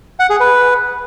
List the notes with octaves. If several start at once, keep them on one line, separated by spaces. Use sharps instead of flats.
F#5
G#4
B4